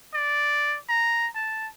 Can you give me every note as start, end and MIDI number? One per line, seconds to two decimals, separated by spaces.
0.14 0.77 74
0.89 1.28 82
1.35 1.69 81